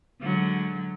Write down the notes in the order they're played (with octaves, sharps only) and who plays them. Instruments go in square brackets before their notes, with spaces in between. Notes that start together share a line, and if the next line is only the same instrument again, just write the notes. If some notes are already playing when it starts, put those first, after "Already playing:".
[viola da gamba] D3 F#3 G#3